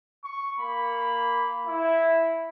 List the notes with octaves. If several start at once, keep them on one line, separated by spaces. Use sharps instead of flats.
C#6
A#3 B5
E4